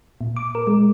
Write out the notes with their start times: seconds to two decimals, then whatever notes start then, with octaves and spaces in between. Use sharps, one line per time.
0.21 A#2
0.36 D6
0.55 A#4
0.67 G#3